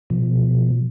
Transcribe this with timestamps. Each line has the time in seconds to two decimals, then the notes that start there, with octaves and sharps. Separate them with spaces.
0.10 B2 F3